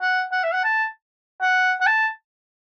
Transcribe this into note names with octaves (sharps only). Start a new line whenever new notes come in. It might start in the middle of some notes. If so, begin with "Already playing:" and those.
F#5
F#5
E5
F#5
A5
F#5
F#5
A5